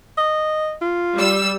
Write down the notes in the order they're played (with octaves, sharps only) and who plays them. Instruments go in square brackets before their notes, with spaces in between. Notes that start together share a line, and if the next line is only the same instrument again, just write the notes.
[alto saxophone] D#5
F4
[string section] G3 E6